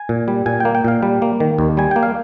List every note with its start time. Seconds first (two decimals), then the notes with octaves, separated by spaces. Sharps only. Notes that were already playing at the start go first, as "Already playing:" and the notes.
Already playing: G#5
0.09 A#2
0.28 G3
0.46 A#2 G#5
0.60 A#3 G5
0.75 G5
0.85 A#2 F5
1.03 G3
1.22 A#3
1.40 D#3
1.59 D#2
1.77 G3 G#5
1.91 A#3 G5
2.03 F5